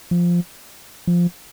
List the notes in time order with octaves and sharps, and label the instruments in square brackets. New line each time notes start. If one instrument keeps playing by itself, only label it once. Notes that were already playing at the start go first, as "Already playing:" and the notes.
[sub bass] F3
F3